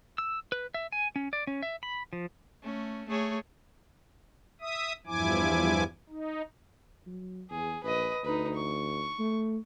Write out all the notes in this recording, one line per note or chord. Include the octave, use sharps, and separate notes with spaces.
E6
B4
E5
G#5
C#4
D5
C#4
E5
B5
F3
A3 C#4
A3 G#4 C#5
E5 D#6
E2 G2 F3 E4 G#5 D6
D#4
F#3
E2 G#4
A#1 B4 D#5
D2 D#4 B4
C#6
A3